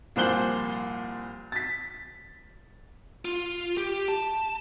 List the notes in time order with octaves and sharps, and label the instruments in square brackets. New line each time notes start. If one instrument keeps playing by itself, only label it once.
[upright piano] C2 A#2 F3 C5 F#6 G7
A6 B6
[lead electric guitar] F4
G4
A5